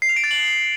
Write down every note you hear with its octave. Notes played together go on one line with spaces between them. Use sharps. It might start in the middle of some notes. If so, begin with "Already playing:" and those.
C7
F7
D7
A6
F#7